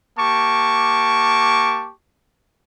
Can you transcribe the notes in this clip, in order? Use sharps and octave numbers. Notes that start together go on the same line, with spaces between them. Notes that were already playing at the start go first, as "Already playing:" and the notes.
A#3 G4 A5 C#6 D6